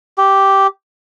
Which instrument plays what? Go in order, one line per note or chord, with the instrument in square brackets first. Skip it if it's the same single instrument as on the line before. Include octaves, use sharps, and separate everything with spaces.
[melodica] G4